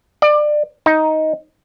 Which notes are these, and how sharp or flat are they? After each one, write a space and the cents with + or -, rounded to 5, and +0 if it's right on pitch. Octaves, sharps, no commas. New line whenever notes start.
D5 +25
D#4 +10